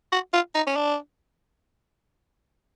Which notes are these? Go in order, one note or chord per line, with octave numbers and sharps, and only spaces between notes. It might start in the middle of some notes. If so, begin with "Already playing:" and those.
F#4
F4
D#4
C#4
D4